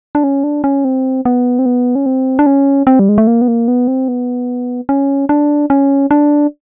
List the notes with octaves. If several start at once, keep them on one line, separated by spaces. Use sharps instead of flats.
D4
C#4
D4
C#4
C4
B3
C4
B3
C#4
C4
D4
C#4
C4
G3
G#3
A3
A#3
B3
A#3
B3
C4
B3
C#4
D4
C#4
D4